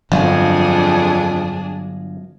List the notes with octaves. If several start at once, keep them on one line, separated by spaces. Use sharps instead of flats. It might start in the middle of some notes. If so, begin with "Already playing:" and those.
G1 F2 F3 F#3 D4 G#4